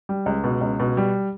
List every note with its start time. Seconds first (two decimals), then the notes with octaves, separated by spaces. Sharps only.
0.09 G3
0.26 C#2
0.44 B2
0.61 C#2
0.80 B2
0.97 G3